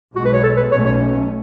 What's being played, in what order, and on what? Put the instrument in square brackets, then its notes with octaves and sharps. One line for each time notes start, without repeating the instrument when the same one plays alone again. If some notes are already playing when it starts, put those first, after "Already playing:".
[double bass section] B1 B2 G#3 [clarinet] F#4
[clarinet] B4
C#5
A4
B4
[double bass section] B1 B2 A3 C#4 [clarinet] C#5
[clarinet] C#5